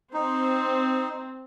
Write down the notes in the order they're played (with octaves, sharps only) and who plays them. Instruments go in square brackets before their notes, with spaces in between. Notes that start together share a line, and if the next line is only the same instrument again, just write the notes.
[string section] C4 [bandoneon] D#4